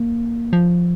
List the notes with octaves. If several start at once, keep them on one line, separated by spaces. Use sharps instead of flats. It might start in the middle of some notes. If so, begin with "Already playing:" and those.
Already playing: A#3
F3